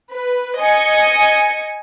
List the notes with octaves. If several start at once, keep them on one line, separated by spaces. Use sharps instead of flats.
B4
D#5 G#5 C#7